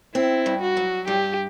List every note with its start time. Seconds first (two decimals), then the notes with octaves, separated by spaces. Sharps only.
0.14 C4 E4
0.46 G2
0.61 F#4
0.77 F#3
1.07 G2 G4